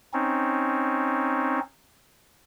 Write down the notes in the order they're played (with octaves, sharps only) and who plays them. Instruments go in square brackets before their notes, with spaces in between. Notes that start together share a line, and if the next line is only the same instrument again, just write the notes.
[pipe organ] C4 C#4 D#4